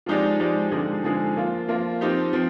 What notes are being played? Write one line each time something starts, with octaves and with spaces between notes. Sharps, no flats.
F3 G#3 D#4 G4 D5
F3 G#3 D#4 G4 D5
D3 F3 G#3 D#4 G#4
D3 F3 G#3 D#4 G#4
F3 A#3 F4
F3 A#3 F4
F3 C4 D#4 G4
F3 C4